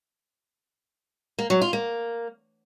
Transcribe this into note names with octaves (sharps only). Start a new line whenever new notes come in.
A#3
F#3
F4
A#3